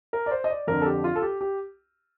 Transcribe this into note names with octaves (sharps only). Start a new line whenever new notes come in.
A#4
D5
C5
D#5
D5
F2 D3 A#4
A4
G4
F4
A4
G4
G4